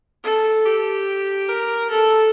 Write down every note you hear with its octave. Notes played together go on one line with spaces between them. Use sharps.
A4
G4
A#4
A4